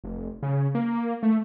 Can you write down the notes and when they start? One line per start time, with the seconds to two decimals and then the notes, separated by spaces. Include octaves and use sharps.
0.04 F1
0.43 C#3
0.75 A#3
1.23 A3